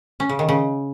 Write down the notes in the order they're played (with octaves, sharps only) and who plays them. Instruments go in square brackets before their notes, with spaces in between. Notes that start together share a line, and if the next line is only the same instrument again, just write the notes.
[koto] C#4
C#3
D#3
C#3